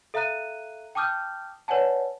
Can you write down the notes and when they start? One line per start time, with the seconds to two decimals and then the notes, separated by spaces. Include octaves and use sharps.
0.14 A4 E5 F5 A#5 F#6 D#7
0.95 G5 A5 D6 D#6 F6 G6
1.68 B4 C#5 D5 F#5 G#5 A5